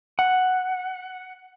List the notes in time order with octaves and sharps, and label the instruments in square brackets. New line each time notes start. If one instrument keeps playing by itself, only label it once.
[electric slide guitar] F#5